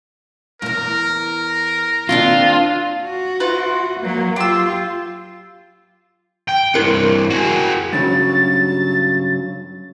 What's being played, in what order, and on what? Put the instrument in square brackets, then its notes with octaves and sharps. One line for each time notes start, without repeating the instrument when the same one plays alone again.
[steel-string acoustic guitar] E2 G2 [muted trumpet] A#4
[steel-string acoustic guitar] D#2 C4 D4 [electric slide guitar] F4
[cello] F#4
[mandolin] E4 F4 B4
[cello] F#3 A#3
[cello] F4 [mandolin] G4 E6
[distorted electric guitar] G5
[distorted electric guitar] C2 G2 [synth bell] E4 A#4 C#7
[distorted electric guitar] F#4 G#4
[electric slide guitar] G2 C#3 F#3 [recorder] A6